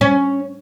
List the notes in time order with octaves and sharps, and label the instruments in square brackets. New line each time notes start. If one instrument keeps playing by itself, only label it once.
[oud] C#4